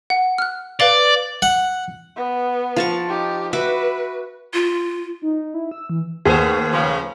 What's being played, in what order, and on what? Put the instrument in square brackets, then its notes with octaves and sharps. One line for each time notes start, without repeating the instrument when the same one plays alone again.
[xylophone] F#5
F6 F#6
[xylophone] B4 F5 G7 [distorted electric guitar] D5
[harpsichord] F#5
[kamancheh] B3
[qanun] F3 A5 C#6
[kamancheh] D#4 G4
[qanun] F#4 E5 D6 [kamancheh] B4
[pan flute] F4
[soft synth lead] D#4
E4
E6
E3
[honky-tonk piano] D#2 [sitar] A3 B3 C5 [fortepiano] G#4
[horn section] C#3 F3